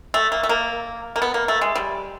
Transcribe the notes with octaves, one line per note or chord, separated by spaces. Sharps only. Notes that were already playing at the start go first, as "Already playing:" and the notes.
A3
A#3
A3
A#3
A#3
B3
A#3
A3
G#3
G3